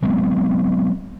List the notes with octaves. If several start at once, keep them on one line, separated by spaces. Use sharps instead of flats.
F#3 G#3 B3 C4